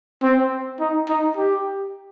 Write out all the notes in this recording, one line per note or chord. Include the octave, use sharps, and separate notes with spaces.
C4
D#4
D#4
G4